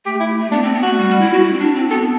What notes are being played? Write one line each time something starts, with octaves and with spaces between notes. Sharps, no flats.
A3 G4
E4
A3
B3 D4
C4
B3
A3 F#4
G3
G3
E4
F#4
E4
C4
D4
C4
B3 A4